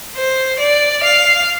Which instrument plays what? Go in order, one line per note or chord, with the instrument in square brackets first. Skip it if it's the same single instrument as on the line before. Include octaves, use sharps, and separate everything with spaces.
[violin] C5
D5
F5